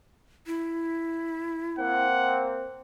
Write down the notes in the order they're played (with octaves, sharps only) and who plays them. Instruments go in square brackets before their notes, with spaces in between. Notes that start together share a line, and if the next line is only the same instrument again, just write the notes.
[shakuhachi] E4
[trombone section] A#3 C4 [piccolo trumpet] F#5